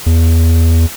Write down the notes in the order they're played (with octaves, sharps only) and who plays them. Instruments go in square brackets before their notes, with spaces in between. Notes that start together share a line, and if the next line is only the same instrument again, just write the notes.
[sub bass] E2